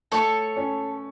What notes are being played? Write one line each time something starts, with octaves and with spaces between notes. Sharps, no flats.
A3 A4 C#5
C#4